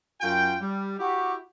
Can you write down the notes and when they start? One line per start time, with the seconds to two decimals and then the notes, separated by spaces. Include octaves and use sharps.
0.21 F#2 F4 G5
0.61 G3
0.99 E4 F#4 G4